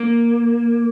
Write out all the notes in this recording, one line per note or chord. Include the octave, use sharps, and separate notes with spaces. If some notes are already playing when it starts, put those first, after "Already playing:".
Already playing: A#3